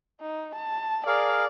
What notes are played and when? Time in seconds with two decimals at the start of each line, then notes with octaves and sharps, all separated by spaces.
0.21 D#4
0.55 A5
1.07 G#4 A#4 D5 F5